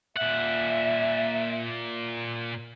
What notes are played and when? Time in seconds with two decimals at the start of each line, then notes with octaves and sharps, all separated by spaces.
0.17 A#2 E5 F#5